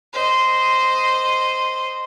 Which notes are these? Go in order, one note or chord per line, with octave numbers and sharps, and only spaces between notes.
C5 D#5